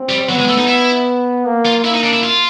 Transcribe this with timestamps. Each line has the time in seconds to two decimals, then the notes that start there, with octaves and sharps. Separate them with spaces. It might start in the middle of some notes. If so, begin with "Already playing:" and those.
Already playing: C4
0.09 G3
0.29 F#3 B3
0.39 G#3
0.48 A3
0.58 D#4
0.67 E4
1.45 A#3
1.65 F4
1.84 A#3 E4
1.94 D#4
2.03 D4
2.13 E4
2.23 F4